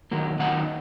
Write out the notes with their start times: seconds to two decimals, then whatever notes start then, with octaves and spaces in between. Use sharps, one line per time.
0.11 D#3 F#3 A#3
0.39 D#3 F#3 A#3 D#4 F#5